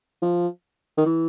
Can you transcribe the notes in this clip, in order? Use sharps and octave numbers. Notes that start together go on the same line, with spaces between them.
F3
D#3
E3